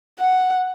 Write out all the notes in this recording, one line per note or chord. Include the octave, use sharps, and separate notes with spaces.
F#5